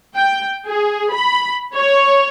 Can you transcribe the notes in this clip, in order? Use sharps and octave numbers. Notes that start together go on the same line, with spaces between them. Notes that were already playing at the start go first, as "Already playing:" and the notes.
G5
G#4
B5
C#5